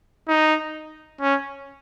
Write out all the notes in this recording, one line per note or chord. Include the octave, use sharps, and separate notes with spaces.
D#4
C#4